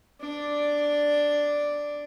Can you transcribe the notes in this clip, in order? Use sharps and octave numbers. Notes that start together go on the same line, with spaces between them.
D4 D5